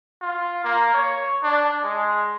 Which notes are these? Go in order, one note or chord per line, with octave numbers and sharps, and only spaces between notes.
F4
A#3
C#5
D4
G#3